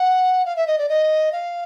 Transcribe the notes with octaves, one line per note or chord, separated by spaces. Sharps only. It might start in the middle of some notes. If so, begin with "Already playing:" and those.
Already playing: F#5
F5
E5
D#5
D5
D#5
F5